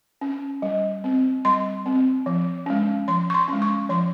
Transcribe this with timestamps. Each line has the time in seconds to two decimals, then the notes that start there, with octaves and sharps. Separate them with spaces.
0.21 C#4
0.62 G3
1.04 C4
1.45 G3 C6
1.86 C4
2.26 F3
2.66 G#3 C#4
3.08 F3 C6
3.30 C#6
3.34 C6
3.48 G#3 C#4
3.62 C#6
3.89 F3 C6